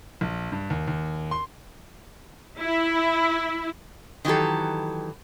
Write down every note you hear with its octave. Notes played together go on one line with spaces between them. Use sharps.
A#1
G2
D#2
D#2
C6
E4
D#3 E3 F#3 G4 A4